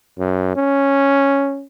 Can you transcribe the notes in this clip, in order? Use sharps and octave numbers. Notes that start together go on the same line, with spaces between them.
F#2
C#4